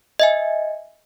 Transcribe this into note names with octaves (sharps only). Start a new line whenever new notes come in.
D#5 E5 G#5